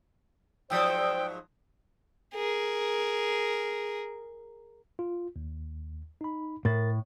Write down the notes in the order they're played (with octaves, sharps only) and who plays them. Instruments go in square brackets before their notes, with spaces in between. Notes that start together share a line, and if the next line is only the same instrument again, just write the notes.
[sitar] G#2 F3 F#3 [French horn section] C5 [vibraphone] D5 D#6 E6 [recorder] G5
[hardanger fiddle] G#4 A#4
[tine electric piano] F4
D#2
D#4 B5
[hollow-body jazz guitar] A2 [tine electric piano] A#4 A6